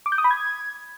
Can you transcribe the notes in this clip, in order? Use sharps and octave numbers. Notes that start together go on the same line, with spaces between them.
D6
G6
D#6
B5
G#6